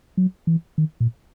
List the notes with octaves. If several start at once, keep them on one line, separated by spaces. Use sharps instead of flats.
F#3
E3
D#3
A#2